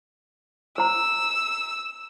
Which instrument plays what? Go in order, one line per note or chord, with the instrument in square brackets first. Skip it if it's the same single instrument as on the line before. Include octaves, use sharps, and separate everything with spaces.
[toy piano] C5 A#5 [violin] E6